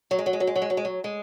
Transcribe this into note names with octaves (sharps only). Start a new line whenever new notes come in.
F#3
G#3
F#3
G#3
F#3
G#3
F#3
G#3
F#3
G#3
F#3
G#3